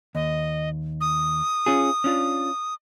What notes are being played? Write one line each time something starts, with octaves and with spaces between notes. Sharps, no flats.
D#2 D#5
D#6
C#4 F4 G#4
C#4 D4 F4